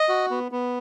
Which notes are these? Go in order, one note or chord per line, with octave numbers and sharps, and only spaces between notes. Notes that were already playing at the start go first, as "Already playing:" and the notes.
Already playing: D#5
F#4
B3
B3